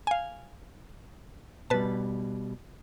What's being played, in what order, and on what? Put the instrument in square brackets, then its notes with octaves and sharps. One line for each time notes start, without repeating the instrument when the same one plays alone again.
[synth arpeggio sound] F5 G#5
[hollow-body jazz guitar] B2 G3 [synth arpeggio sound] B4 A5